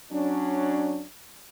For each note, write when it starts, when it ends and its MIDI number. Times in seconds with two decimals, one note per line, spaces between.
0.11 1.03 54
0.11 1.03 61
0.11 1.03 62